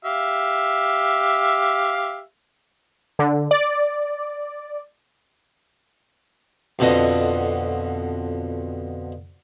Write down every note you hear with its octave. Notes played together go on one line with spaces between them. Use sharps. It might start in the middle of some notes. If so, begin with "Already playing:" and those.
G4 E5 F5
D3
D5
F2 B2 D3 D#5